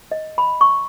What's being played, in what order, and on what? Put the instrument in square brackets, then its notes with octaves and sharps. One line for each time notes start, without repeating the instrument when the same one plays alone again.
[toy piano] D#5
B5
C#6